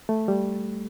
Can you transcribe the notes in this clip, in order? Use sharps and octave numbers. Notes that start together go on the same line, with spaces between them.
A3
G3